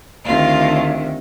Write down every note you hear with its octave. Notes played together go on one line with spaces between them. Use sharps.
D2 C3 D#3 F4